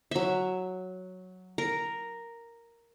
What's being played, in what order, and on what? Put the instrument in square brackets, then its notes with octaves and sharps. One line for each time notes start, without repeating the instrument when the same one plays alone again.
[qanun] F#3 E5
A#4